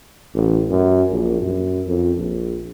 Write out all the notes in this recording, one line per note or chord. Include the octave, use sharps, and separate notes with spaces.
A1
F#2
A#1
F#2
F2
A#1